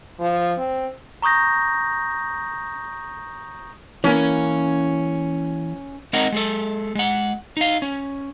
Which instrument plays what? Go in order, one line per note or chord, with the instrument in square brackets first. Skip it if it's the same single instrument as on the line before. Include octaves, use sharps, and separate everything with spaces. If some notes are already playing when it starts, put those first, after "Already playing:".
[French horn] F3
C4
[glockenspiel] A#5 C#6 D#6 G6 A#6
[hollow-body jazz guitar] E3 A#3 [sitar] C#4
[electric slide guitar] G#3 C4 D#4 A#4 F#5
G#3 G#4 A4
G#3 F#5
D#4 F5
C#4